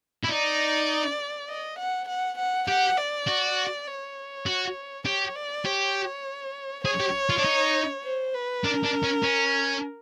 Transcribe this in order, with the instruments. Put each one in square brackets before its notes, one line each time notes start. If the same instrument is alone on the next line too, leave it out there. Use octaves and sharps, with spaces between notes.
[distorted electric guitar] E4
[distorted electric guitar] D#4 [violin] D5
[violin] D#5
F#5
F#5
F#5
[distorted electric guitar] G4 [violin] F#5
[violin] D5
[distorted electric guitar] F#4
[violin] C#5
[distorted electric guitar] F#4
[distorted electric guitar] G4 [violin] C#5
[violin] D5
[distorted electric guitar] G4 [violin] C#5
[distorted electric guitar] G#4 [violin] C#5
[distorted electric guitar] G4
F4
D4
D#4
[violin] C5
B4
[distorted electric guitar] D4 [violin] A#4
[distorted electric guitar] D4
C#4
C#4